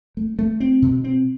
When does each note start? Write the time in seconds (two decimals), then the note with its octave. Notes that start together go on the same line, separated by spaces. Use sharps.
0.17 A3
0.39 A3
0.60 C4
0.82 B2
1.04 C4